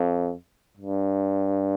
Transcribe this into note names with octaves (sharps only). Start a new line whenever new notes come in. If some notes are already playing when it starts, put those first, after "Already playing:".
Already playing: F2
G2